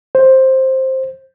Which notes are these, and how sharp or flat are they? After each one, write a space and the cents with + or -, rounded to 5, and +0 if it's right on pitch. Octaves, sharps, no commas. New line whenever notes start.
C5 +10